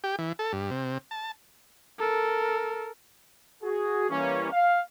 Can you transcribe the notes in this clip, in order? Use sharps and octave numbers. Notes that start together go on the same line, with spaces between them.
G4
E3
A4
G2
C3
A5
A4 A#4
F#4 G#4
E3 G3 A#3 C#4
F5